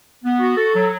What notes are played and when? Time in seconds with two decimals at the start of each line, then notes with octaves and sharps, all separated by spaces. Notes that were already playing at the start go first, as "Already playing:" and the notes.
0.24 B3
0.40 F#4
0.57 A4
0.75 F#3